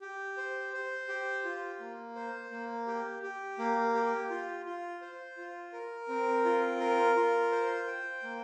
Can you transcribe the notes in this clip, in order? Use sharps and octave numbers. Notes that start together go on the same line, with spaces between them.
G4
C5
C5
G4
F4
A#3
C5
A#3
G4
G4
A#3
G4
F4
F4
C5
F4
A#4
C4
F4
A#4
F4
C5
G5
A#3